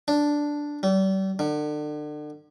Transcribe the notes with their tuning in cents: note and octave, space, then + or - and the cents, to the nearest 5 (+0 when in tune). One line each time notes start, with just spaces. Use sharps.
D4 +0
G3 -35
D3 +35